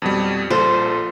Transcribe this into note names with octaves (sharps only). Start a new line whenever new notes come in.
F2 B2 G3
A#1 F4 A4 C5